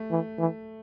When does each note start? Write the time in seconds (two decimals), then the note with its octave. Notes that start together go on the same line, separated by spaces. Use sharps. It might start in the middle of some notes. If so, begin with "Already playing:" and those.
Already playing: A3
0.11 E3
0.38 E3